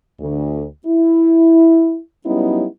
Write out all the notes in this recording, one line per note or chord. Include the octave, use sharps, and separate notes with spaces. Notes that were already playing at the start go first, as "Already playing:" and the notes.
D2
E4
F#3 G3 B3 C#4 D#4 E4